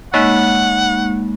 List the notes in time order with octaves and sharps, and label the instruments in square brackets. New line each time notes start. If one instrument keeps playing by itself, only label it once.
[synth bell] G#3 A#3 D#4 [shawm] F#5